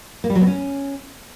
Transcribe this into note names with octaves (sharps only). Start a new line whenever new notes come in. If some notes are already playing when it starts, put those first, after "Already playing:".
A#3
G3
F#3
B3
C#4